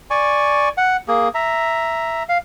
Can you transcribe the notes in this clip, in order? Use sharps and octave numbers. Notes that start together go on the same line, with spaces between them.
D5 G#5 C#6
F#5
A#3 G#4
E5 A#5
F5